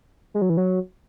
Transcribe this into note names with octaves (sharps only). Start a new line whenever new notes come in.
G#3
F#3
E3
F#3